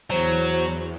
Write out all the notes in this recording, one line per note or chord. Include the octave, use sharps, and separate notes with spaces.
E2 F#3 C5